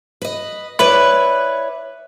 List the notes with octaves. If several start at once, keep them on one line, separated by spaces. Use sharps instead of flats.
B4 D#5
E4 B4 C#5 D5